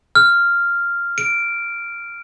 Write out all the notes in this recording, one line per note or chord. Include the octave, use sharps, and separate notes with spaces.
F6
D7